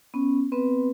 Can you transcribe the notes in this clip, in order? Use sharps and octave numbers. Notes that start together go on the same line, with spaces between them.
B3 C#4
B3 C4 B4